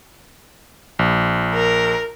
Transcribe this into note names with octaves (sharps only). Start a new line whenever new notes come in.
A#1
A#4